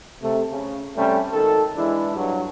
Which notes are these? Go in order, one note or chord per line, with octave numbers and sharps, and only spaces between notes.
C3 A3
C#3
C3 G3 A3 C#4
G#1 D#3 A4
E3 G#3 D4 E4
G2 F#3